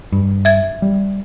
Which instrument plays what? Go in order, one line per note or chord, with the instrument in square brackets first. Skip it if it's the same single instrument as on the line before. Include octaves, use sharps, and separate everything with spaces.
[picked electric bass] G2
[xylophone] E5 G#6
[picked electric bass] G3